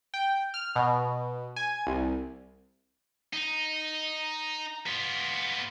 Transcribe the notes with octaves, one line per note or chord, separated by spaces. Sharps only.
G5
F6
B2
G#5
C2
D#4
B3 F4